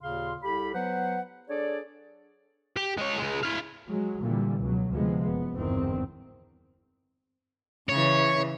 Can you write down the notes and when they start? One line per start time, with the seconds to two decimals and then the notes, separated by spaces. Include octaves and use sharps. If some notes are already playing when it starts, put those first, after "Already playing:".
0.01 D#2 A#2 C#3 F5 C6
0.43 C2 G4 A4 B5
0.74 F#3 B3 B4 C5 F#5
1.49 D4 G#4 A4 C#5 D5
2.76 G4
2.98 G#3 C#5
3.17 C#3 G#3
3.43 E4 F5
3.88 F#3 G#3
4.22 A#2 D3 E3 G3
4.59 C#2 B2 F#3
4.92 D2 C3 F3 G#3 B3
5.24 F#1 B3
5.55 G1 E2 G#2 D#3 C4
7.89 C#3 E3 C#5